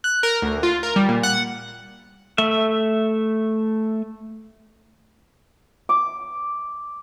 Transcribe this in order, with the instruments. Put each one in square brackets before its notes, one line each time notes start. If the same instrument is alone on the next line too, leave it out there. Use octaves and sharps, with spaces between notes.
[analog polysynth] F#6
A#4
D2
F4
A#4
G3
A#2
F#5
[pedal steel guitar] A3 E5
[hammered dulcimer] D6